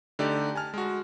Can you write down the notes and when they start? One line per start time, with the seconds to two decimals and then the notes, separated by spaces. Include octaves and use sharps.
0.19 D3 A3 D#4 G4 D5
0.56 G#5 A5 F6
0.74 G#3 F#4